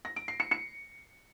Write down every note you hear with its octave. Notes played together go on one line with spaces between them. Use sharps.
A#6
D7
C7
C#7
C#7